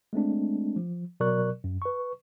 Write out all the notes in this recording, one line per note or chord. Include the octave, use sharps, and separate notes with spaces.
G#3 A3 C4 D4
F3
B2 F#3 A#4 D5 C#6 F#6
F#2
B4 C#6